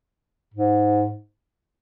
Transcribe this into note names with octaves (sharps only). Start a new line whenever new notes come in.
G#2